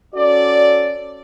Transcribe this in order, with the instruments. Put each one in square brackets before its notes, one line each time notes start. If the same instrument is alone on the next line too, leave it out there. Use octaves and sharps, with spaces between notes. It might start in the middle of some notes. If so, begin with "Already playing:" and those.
[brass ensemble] C#4 F#4 A4 D5